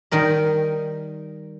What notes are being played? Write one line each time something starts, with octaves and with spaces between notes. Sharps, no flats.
D#3 G3 A#4 D#5